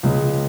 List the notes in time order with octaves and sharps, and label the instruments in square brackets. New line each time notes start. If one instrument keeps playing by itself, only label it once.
[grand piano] C#2 C#3 G#3